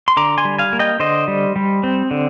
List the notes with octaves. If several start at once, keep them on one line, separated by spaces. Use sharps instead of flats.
C6
D3 A#5 D6
G#5 C6
G3
F5 G#5
A#3
D#5 G5
D3 C5 D#5
G3
G3
C4
D3